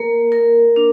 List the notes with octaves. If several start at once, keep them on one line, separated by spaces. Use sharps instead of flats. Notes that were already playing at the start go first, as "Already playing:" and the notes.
Already playing: A#3 A#4
A#4
D4